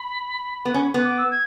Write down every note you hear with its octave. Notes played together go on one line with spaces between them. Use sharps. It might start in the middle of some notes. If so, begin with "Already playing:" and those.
Already playing: B5
B3
C#4
B3
D6
E6
G#6